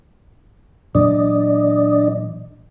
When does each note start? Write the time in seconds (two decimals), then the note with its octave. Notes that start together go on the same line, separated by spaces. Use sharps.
0.95 A#2 E3 F#3 D4 D5 D#5